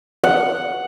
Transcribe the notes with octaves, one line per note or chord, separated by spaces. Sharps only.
F#5